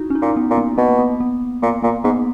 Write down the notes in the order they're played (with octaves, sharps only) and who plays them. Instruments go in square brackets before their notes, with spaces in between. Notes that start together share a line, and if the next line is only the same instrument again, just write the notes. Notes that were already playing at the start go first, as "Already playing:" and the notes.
Already playing: [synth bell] D#4 E4 F#4
C#4
D#4
[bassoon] A#2
[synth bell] B3
[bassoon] A#2
[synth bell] A#3
[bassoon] B2 [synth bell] B3
[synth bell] A#3
B3
B3
[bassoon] A#2 [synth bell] A#3
[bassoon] A#2 [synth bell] A#3
[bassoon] G#2 [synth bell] B3